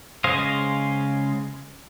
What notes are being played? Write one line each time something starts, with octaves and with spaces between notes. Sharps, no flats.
C#3 G#3 C5 D#5 F5